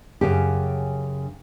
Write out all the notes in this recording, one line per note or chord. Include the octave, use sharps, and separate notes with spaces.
F#2 C#3 G4